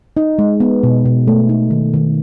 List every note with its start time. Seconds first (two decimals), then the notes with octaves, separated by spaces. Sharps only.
0.17 D#4
0.39 G#3
0.60 B3
0.83 B2
1.06 B2
1.27 A3
1.49 D#4
1.71 D#3
1.94 D#3